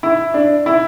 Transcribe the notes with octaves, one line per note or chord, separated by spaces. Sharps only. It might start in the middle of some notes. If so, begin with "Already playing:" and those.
E4
D4
E4